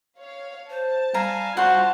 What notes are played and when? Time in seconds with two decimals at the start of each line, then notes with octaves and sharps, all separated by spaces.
0.18 C#5 F5
0.70 C5 A5
1.14 G3 F5 G#5 A#5
1.57 D4 F4 F#4 C5 F#5 A5 C6